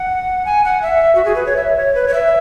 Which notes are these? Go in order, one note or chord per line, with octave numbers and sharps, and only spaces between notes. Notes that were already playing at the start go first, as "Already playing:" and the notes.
Already playing: F#5
G#5
F#5
E5
F#4
G#4
B4
C#5
E5
C#5
B4
C#5
E5